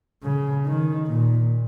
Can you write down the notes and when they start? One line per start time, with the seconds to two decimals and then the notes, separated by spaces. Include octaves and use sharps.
0.23 C#3
0.66 D#3
1.08 A#2